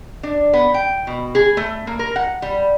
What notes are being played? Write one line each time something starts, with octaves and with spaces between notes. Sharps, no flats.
D4
B3
G5
B2
G#4
A3
A#3
A#4
F#5
G3